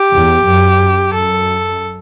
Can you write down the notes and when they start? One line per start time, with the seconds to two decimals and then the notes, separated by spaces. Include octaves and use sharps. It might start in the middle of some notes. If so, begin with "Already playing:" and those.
Already playing: G4
0.12 E2
0.45 F#2
1.13 F#2 A4